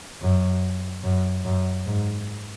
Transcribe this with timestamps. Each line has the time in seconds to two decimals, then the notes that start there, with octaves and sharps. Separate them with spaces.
0.22 F#2
1.04 F#2
1.45 F#2
1.86 G#2